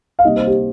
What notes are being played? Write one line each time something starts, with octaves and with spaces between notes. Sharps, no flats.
F5
C3 G3 A#3 D#4 D#5
C5
G4